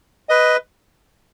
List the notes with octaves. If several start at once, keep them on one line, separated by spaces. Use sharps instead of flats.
B4 D#5